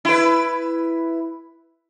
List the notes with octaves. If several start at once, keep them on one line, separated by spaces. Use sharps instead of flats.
E4 B4